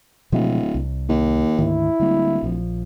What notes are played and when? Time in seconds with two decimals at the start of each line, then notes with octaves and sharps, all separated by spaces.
0.32 D1 B2 F3 G#3
0.75 C2
1.09 D#2
1.59 D2 G#2 D#3 E4
2.00 D1 D3 G3 A#3
2.43 A#1 F3